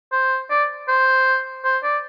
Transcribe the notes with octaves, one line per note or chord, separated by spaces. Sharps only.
C5
D5
C5
C5
D5